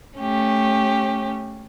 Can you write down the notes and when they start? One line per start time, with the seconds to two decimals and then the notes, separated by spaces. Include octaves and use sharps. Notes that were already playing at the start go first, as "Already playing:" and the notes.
0.17 A3 C#4 G4